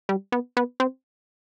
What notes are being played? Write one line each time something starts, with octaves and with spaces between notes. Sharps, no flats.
G3
B3
B3
C4